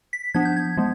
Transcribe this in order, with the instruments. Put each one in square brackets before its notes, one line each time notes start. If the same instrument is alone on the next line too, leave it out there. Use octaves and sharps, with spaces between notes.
[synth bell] B6
F3 B3 D4 G#6
G6
G#6
F3 G#3 B3